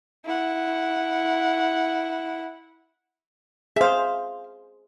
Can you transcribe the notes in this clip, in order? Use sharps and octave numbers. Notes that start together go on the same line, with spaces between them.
E4 F#5
G#4 C5 E5 F5